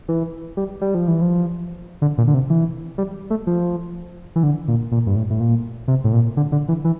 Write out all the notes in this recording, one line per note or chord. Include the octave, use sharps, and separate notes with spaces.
E3
G3
G3
F3
E3
F3
D3
A#2
D3
C3
E3
G3
A3
F3
E3
D3
A#2
A#2
G2
A2
A2
A#2
C3
A2
A#2
D3
D3
E3
E3